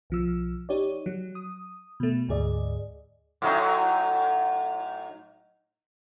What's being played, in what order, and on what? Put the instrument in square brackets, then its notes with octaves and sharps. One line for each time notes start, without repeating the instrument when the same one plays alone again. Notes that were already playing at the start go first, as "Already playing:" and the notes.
[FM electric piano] B1 F3 E6
D#4 G4 C#5 D5
F#3
D#6
B2 A3
D2 G#2 G#4 D5 D#5
[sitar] A2 F#3 D#4